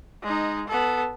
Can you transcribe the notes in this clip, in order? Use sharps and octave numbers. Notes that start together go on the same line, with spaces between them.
G#3 D#4
B3 A4